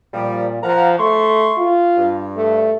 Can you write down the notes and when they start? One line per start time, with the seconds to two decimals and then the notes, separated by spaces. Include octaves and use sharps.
0.14 A#2 F3 G3
0.64 F3 F5 F#5 A#5
1.00 A3 C6 C#6
1.58 F4
1.97 G2
2.37 A3